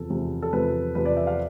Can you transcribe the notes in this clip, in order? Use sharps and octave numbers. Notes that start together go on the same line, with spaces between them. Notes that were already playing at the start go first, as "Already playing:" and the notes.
Already playing: E2 C3 F3 A4
E2 C3 F3
A4
E2 C3 F3 B4
E2 C3 F3 B4
D5
E5
F5